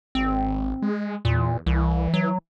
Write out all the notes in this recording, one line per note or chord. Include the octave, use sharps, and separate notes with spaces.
G#1 C4
G#3
E2 A#2
C2 E3
F#3